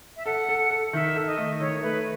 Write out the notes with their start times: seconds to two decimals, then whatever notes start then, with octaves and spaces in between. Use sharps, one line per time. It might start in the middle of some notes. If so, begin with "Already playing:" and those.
0.17 E5
0.26 A4 F#5
0.49 A4
0.71 A4
0.93 D#3 E5
1.16 A4
1.27 D#5
1.37 A3
1.60 D#3 C#5
1.83 A3 B4